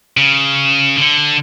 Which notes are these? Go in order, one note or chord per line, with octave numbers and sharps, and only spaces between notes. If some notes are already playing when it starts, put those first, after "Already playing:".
C#3
D3